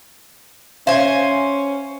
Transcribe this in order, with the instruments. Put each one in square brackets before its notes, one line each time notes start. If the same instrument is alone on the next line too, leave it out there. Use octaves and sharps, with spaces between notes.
[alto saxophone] C#4 [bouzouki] C5 G#5 [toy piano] E5 F5